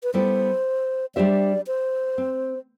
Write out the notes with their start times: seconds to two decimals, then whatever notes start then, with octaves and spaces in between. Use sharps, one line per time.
0.03 B4
0.14 G3 B3 E4 A4 C5 D5
1.15 G3 D4 G4 C5 D5 E5
1.67 C5
2.18 C4